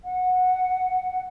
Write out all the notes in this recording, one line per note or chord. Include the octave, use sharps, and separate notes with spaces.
F#5